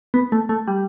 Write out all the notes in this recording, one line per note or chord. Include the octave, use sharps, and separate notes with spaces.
B3
A3
A3
G3